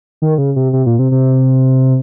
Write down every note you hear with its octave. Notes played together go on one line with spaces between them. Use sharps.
D#3
C#3
C3
C3
A#2
C3
C3